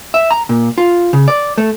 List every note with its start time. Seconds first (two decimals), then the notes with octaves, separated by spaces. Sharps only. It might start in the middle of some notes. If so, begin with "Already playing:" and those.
0.14 E5
0.31 A#5
0.49 A#2
0.78 F4
1.13 C#3
1.28 D5
1.58 A3